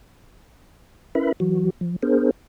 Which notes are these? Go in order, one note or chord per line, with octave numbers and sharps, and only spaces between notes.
C#4 E4 A#4 B4 E5 B5
E3 F#3 F#4
F3
B3 D4 G#4 A#4 C5